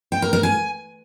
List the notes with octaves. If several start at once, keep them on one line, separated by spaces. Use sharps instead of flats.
G5
A#4
A#4
G#5